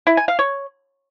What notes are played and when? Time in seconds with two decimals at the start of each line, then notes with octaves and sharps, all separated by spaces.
0.07 E4
0.17 G#5
0.28 F5
0.39 C#5